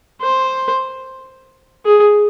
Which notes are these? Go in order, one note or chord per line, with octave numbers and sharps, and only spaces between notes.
C5
G#4